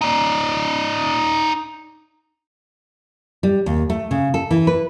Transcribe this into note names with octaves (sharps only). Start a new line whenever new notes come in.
D#4 D5
G3
D#2
A3
C#3
A4
E3
B4